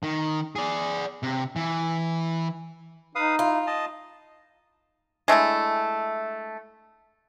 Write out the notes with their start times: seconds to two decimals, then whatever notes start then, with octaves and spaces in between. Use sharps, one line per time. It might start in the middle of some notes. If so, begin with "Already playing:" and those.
0.03 D#3
0.56 G#4 D5
1.23 C3
1.56 E3
3.15 D#4 B4 F5 D#6
3.39 E4 F4
3.67 D#5 A5
5.28 G#3 A3 D4 E4